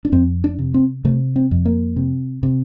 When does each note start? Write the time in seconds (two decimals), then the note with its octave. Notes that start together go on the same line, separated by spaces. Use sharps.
0.05 D4
0.12 F2 C4
0.44 D4
0.59 C3
0.74 C4
1.05 C3 A3
1.36 C4
1.51 F2
1.65 A#3
1.96 C3
2.43 C3